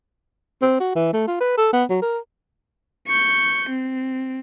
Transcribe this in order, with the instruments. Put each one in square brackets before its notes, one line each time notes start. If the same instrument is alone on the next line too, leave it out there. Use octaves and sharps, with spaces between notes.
[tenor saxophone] C4
F#4
E3
A3
F4
B4
A4
B3
F#3
A#4
[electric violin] C#6 G6
C4